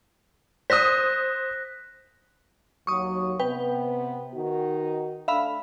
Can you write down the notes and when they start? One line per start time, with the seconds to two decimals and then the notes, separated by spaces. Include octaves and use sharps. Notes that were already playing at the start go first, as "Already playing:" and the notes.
0.70 C5 D#6 F#6 A#6 B6
2.87 D#2 F#3 C#6 D#6
3.39 C3 B3 B4 G5
4.35 D#3 D#4 F#4
5.28 A3 D4 E5 F5 B5